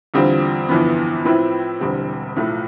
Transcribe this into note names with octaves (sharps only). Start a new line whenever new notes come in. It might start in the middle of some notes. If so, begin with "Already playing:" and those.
E2 D3 G3 C4 F4
G1 F2 E3 B3
A2 F3 C4 E4 B4
E1 E2 D3 G3 C4
B1 A2 F3 A3